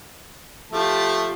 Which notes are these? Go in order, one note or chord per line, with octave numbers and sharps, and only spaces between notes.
F3 A3 F4 G4 A5